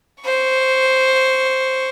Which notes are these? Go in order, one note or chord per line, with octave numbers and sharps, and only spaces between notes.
C5 C#6